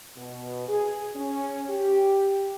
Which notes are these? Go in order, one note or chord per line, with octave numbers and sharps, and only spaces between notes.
B2
G#4
C#4
G4